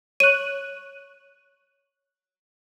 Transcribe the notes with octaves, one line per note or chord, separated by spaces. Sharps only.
C#5 F#6 D#7